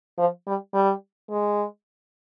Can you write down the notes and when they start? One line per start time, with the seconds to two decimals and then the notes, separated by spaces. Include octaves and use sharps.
0.18 F3
0.47 G3
0.74 G3
1.31 G#3